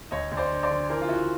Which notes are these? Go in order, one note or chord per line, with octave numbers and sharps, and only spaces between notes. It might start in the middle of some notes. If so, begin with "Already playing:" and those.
D2 C#5 D#5
D2
C5 D5
D3
C5 D5
D3
E3 A#4 C5
F4
C#3 E4 F#4